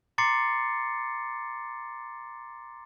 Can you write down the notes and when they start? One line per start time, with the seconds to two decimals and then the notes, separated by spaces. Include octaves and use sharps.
0.18 A#5 C6 D6 A6 C7 C#7